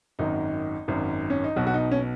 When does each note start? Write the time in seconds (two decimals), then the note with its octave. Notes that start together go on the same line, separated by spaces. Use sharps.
0.19 G#1 F#2 D#3 D#4
0.88 G#1 F#2 D#3
1.30 C#4
1.44 D#4
1.56 B1 B2 F#3 F#4
1.67 F#4
1.74 D#4
1.91 C#4